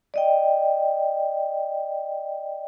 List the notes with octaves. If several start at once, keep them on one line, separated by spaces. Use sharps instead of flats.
D5 D#5 G5